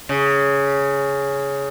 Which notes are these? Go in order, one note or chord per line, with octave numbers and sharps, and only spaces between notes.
C#3